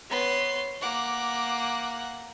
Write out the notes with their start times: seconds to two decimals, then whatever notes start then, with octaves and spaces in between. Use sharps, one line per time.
0.10 B3 C#5 C6
0.82 A#3 F#5 D6